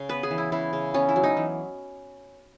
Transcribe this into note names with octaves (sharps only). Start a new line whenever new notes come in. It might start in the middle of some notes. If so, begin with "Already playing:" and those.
Already playing: C#3
B3 B4
G#4
E3
E4
C#3 E4
C#3
B3 C#4
E4
F#3
D#4
E3